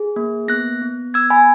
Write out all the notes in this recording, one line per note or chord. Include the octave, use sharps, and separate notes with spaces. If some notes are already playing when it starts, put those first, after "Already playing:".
Already playing: G#4
A#3
B3 F#6 A#6
B3
B3 E6 G#6
G#5 B5